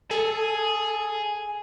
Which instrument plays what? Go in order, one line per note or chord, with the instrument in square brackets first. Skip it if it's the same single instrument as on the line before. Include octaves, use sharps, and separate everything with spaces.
[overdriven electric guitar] G#4 [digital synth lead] A4